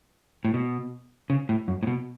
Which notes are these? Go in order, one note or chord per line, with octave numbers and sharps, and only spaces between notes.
A2
B2
C#3
A2
F#2
A2
B2